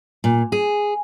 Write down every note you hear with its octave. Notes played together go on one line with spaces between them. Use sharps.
A#2
G#4